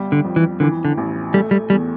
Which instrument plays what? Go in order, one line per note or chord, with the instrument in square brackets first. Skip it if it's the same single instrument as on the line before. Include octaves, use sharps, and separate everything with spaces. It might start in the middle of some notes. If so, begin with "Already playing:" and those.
Already playing: [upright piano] G1 G3
[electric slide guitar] D3
[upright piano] F2
[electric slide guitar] E3
[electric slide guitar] D3 [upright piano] E3
[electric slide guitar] D3
[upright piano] A1
[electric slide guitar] G3 [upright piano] A3
[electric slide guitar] G3
[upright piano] E2 [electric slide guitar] G3